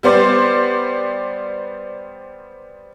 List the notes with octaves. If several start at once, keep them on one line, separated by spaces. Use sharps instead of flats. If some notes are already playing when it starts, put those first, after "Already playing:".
G3 B3 C5 D5